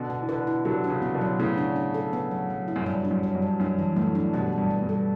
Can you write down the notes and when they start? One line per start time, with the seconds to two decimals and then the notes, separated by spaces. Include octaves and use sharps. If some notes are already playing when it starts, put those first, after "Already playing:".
Already playing: B2 D3
0.10 B3
0.21 E3
0.28 B2 D3 B4
0.47 E4
0.65 D3 F#3 G4
0.84 D4
0.90 C#3 E3
1.02 B3
1.14 B2 D3
1.21 F#3
1.39 A2 C#3 B3
1.58 D4
1.76 D4
1.94 A4
2.13 B3
2.31 F#3
2.50 F#3
2.68 E4
2.76 F#2
2.86 G2 F#3
3.05 D4
3.11 F#2
3.23 F#3
3.35 G2
3.42 F#3
3.60 F#2 D4
3.79 E3
3.96 F#2 A2 A3
4.15 D4
4.33 G2 B2 G3
4.52 G3
4.58 G2
4.70 G3
4.83 G2
4.89 A4